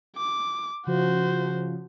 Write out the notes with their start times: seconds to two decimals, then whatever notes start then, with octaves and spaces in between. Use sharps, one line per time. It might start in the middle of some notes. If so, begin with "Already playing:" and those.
0.17 D6
0.87 C#3 F3 F#4 C5